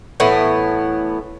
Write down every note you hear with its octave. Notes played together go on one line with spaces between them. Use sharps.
A2 E3 B3